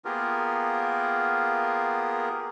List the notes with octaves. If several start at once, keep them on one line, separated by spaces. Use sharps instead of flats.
A#3 B3 F4 G4 G#4 A#4